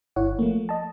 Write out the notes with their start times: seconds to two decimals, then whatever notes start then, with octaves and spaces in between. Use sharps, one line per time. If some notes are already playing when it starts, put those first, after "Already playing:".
0.16 G1 E4 C#5 F#5
0.39 F3 A3 A#3
0.69 D#5 A5